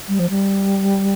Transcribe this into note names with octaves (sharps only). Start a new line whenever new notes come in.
G3
F3
G3